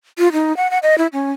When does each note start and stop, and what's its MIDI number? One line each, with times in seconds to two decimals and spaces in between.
0.18 0.32 65
0.33 0.56 63
0.57 0.70 78
0.71 0.78 78
0.83 0.98 75
0.98 1.07 64
1.13 1.31 61